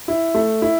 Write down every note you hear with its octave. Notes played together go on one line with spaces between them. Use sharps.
E4
A3
E4